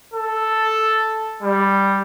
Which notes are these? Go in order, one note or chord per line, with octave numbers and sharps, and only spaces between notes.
A4
G3